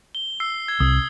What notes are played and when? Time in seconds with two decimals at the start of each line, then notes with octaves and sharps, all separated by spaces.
0.15 G7
0.40 E6 C7
0.68 G#6
0.80 C2 D#6